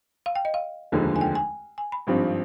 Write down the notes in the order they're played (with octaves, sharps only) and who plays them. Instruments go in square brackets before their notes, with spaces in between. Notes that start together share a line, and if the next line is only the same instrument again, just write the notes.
[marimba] F5
G5
D#5
F5
[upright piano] F1 D#2 D3 F3 G#3
[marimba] G#5
G5
G#5
G#5
B5
[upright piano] G#1 G2 F3 C4